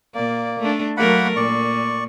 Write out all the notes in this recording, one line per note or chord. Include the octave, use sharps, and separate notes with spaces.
A#2 A#3 D5
A3 D4
F#3 A3 A#3 A#4 F#5 B5
A#2 D5 C#6